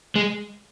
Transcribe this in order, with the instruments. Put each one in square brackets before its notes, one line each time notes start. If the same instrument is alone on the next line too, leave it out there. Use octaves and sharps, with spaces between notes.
[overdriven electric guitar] G#3